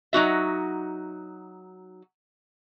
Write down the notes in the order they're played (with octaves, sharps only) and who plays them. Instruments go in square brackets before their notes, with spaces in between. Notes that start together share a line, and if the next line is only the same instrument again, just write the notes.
[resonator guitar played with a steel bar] F#3 D#4 F#4 E5